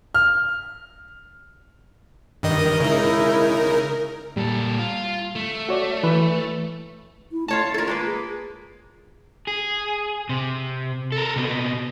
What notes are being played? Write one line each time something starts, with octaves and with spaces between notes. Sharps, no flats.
F6
G2 D#3 A#4 D#5
C#3 G#3 D#4 E4
A#2 G3 A4
F4
A3
F#4 C#5 D5
E3 B4
E4
A3 F4 C#5 A5
F4 A4 A#4
G#3 A#3 B4
G#4
G#4
C3
A4 A#4
C3 B3